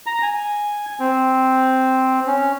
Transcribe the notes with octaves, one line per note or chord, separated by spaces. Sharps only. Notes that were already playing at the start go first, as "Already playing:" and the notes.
A#5
G#5
C4
C#4